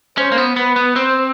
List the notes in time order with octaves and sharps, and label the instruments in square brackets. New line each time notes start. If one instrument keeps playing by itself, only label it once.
[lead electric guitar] C#4 [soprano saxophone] C5
[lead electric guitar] A#3
B3
[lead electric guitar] B3 [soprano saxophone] B4
[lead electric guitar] B3
[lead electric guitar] C4 [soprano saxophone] C5